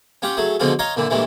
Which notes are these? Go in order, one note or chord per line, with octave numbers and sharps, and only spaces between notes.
C#4 F4 G4 F#5
F#3 A3 G#4
B2 D3 F3 G#3 F4 F#4
C#5 D#5 F5 A#5 C6
A#2 D3 E3
G2 A#2 E3 G#3 A3